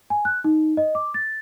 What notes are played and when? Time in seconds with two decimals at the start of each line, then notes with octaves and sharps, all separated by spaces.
0.10 G#5
0.25 F#6
0.44 D#4
0.77 D#5
0.95 D6
1.14 A6